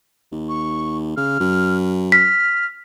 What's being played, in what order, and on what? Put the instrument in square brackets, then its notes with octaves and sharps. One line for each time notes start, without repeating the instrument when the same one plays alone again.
[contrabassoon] D#2
[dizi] C#6
[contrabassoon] C#3 [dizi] F6
[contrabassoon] F#2
[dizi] F6 [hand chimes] B6